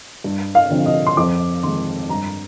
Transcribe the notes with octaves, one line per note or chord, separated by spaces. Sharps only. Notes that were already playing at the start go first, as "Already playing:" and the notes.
G2
F5
D3 F3 C4
D#5
C6
F2 D6
D#3 G#3 C6
G2 A#5